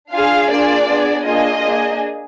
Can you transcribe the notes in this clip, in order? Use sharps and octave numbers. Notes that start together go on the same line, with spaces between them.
D4 F4 G#4 F5
A#3 D4 F4 G#4 D5
B3 D4 G#4
A#3 D4 F4 G#4 D#5
A#3 D4 G#4